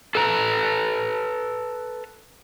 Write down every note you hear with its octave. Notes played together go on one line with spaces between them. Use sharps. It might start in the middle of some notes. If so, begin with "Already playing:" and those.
A4 B4 A#5